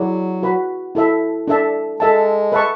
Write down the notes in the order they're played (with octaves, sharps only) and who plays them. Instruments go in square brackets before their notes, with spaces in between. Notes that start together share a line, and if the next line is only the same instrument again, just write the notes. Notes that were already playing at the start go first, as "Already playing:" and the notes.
Already playing: [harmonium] F#3 [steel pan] E4 G#4 D5 F#5
[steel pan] F#4 B4 F#5 B5
E4 A4 E5
D4 A4 E5 A5
[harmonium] G#3 [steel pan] A4 E5 A5
[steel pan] B4 E5 A5 C#6